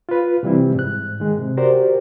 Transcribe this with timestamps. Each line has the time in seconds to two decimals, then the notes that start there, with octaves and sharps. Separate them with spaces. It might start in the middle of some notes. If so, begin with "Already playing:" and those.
0.09 F4 B4
0.43 C3 E3 G3 C4 E4
0.75 G#2 F#6
1.20 D#3 G#3
1.38 C3
1.57 F#4 G4 A#4 C5 D5